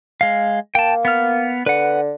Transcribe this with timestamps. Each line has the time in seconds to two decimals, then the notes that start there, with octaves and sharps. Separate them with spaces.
0.21 G#3 F5
0.75 A#3 G5 A5
1.05 B3 F6
1.66 D3 B4 F#5